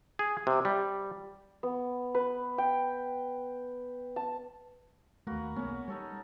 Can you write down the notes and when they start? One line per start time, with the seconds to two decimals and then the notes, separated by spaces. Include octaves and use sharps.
0.19 G#4
0.47 C3
0.65 G3
1.63 B3
2.15 B4
2.58 G5
4.16 A5
5.27 D#2 A3 A#3 F#4 B4
5.56 B1 G#3 A#3 B3 C#4
5.88 G3 D#4 A4 C#5